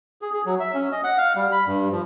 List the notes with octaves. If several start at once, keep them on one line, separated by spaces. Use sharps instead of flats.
G#4
G#4
F#3
E5
C#4
D#5
F#5
F5
G3
B5
G2
F3